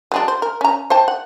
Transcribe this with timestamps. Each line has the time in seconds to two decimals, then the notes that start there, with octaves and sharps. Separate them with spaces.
0.12 F#3 G#3 D4
0.28 C5
0.42 A#4
0.61 C#4 A#5
0.90 C5 G5 A5
1.08 F#5